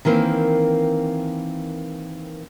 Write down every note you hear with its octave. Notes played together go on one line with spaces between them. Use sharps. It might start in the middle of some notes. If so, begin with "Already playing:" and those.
D#3 E3 A#3 C4